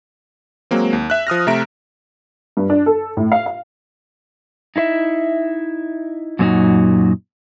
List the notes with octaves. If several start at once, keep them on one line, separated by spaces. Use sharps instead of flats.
F#3 G#3 A#3 C4
D#2
E5 F#6
F3 D#6 F6 A#6
C3 A3 E5 A#5 D7
G2
D4
A4
A2
F5
F5
D#4 E4 B4 E5
F#2 A#2 F#3 B3 D#4 F#4